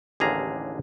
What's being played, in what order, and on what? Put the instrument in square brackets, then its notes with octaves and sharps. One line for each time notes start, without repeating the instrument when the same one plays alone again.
[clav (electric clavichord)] A1 D#2 D3 G#4 F5 A#5